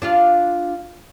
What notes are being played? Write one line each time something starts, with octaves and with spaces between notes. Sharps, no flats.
D4 F4 F5